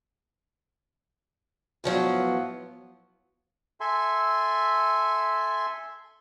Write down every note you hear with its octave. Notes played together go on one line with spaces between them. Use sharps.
A2 F3 F#3 B3
A4 E5 G#5 C6